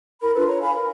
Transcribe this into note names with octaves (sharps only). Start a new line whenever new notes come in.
E4 A#4 B5
D4 F4 A4 B4
C#5 A#5
F5 G#5 B5
A#4